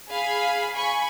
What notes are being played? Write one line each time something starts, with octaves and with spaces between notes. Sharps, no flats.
G#4 F5 G#5 B5
G#5 B5 C#6